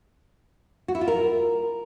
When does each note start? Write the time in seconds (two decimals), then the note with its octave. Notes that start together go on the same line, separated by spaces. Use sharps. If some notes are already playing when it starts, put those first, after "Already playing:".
0.88 F#4
0.95 E4
1.01 F4
1.08 A#4